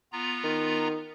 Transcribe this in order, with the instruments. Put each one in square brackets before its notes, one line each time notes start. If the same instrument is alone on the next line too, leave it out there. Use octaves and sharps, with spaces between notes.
[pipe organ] B3 F4 A#5
[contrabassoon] D#3